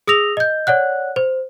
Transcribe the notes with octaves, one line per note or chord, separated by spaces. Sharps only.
G#4 D#6 E6 A#6 F7
D#5 G6
C#5 D5 F#5 F#6
C5